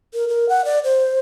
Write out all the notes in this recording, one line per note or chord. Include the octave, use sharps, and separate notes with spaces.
A#4
A#4
F#5
D5
C5